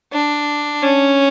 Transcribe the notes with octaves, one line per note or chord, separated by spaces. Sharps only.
D4
C#4